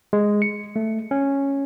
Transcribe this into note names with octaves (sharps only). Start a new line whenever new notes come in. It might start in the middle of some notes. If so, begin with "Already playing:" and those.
G#3
C#7
A3
C#4